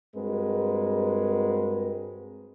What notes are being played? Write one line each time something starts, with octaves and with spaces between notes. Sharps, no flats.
G2 G#3 C4 F#4 A#4 B4